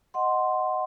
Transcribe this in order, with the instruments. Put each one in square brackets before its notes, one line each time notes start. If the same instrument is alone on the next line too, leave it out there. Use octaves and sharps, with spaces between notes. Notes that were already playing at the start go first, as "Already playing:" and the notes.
[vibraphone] D#5 F#5 C6